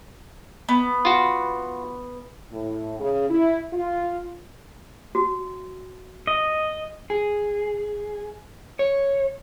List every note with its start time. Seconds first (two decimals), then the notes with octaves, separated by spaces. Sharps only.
0.69 B3
1.05 F4 F#4
2.52 A2
2.99 C#3
3.30 E4
3.73 F4
5.15 F#4
6.27 D#5
7.10 G#4
8.79 C#5